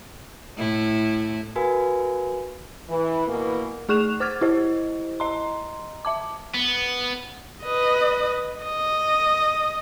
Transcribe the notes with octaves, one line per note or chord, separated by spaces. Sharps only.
A2 E4
F#4 A#4 B4 F5 G#5
E3
B2 E3 A#3
A3 G#4 C#6 F#6 E7 F7
C5 D6 F6 G#6 A6
E4 G4 C5 D#5
D#5 A#5 C6
E5 A5 D6
B3
B4 D#5
D#5